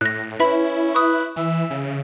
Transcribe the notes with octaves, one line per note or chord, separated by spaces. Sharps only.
A2 F#6 A#6
C#4 E4 B4 E5 B5
B4 C#6 D#6
E3 E5
C#3